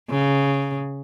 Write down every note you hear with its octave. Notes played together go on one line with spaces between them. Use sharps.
C#3